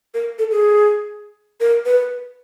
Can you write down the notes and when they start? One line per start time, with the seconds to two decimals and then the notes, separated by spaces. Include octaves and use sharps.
0.14 A#4
0.39 A4
0.51 G#4
1.60 A#4
1.85 B4